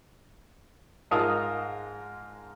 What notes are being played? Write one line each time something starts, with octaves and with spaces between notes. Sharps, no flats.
G#2 F4 A#4 A5 D#6